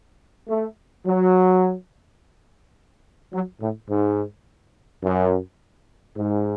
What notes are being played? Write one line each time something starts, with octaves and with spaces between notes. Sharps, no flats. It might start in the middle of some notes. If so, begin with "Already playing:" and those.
A3
F#3
F#3
A2
G#2
F#2
G#2